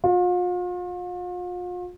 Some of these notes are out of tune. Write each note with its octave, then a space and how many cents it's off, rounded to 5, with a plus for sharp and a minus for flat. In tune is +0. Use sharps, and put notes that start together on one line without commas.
F4 +40